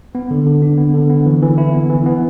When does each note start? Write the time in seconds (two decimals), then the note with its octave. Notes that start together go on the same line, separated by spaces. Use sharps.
0.15 B3
0.31 D3
0.46 D3
0.62 D4
0.78 B3
0.94 D3
1.10 B3
1.26 E3
1.42 E3
1.58 E4
1.74 B3
1.90 E3
2.06 B3